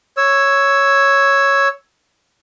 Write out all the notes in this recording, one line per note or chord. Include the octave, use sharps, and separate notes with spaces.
C#5 E6